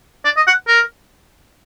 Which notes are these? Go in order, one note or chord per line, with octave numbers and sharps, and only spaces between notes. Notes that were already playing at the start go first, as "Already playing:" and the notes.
D5
D#5
F#5
A#4